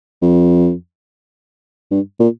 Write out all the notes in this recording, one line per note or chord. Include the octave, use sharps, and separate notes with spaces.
F2
G2
A#2